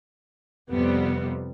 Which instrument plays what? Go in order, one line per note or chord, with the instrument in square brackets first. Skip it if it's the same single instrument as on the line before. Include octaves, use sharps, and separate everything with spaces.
[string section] F2 C3 G3 B3